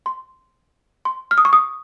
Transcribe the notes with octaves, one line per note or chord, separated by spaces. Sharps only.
C6
C6
F6
D#6
C#6
D#6